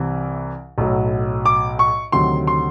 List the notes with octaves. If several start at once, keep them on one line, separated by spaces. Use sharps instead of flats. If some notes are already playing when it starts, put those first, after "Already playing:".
Already playing: C2 C3 E3
B1 A2 F#3
D6
C#6
D2 C3 D#3 F#3 C6
C6